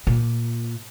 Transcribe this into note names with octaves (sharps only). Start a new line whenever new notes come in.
A#2